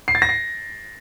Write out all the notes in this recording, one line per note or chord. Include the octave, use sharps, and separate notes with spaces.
C7
A6
A#6
C7